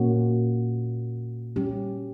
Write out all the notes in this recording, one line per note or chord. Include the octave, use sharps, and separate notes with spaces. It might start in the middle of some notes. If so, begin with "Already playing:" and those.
Already playing: A#2 A#3 C#4 F#4
G3 C#4 G4